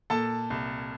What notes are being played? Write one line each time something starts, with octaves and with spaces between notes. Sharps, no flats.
A#2 A4 A5
C2